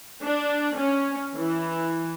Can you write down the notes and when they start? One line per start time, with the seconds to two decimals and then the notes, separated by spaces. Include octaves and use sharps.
0.22 D4
0.77 C#4
1.36 E3